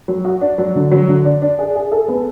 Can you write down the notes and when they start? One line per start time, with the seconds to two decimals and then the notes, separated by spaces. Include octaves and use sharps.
0.08 F#3
0.25 F#4
0.41 D4
0.58 F#3
0.76 D3
0.91 F#3
1.08 D3
1.25 D4
1.42 D4
1.59 G#4
1.75 G#4
1.92 A4
2.08 B3